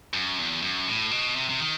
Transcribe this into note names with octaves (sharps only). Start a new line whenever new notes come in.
F#2
E2
F#2
A2
B2
C3
C3
D#3